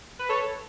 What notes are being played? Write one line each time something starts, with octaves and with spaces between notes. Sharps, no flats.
B4
A4 C#5